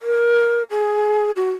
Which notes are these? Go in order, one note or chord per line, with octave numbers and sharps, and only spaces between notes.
A#4
G#4
F#4